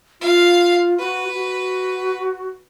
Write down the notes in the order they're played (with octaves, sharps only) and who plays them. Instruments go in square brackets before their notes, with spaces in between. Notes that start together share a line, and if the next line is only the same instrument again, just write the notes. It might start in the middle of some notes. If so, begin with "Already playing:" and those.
[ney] F4 [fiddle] F5
[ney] F#4 [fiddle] B4
[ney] F#4